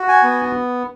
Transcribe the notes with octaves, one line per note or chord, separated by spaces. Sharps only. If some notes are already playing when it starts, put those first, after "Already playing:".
Already playing: F#4
G#5
B3